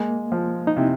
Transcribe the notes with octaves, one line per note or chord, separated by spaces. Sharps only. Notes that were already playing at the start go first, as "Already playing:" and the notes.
Already playing: G#3 A#3
F3
D#4
C3 E4